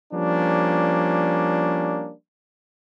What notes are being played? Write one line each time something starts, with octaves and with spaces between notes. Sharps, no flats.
F3 G3 A#3 C#4 D4